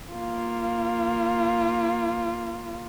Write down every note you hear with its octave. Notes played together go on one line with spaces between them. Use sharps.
A#3 F4